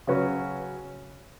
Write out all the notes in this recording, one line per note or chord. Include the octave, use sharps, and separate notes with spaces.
C#3 F#3 C#4 F#4 B4